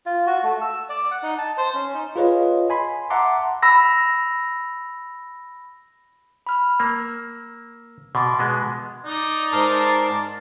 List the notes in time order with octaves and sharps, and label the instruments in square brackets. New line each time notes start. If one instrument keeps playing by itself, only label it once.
[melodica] F4
F#4
A3
E6
D5
F#5
D#4
A5
C5
C#4
D#4
[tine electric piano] F4 G#4 B4 C#5 D#5 F5
G#5 B5 C6
E5 F#5 A5 A#5 C6 D6
[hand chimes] B5 E6 A#6
B5 F6
[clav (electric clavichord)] A#3 [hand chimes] E6
[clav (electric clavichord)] B2 [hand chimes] C6 D6 A6
[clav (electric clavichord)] B2 G#3 B3
[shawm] D#4 [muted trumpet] D5
[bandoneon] G#2 [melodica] A#4 A5 C6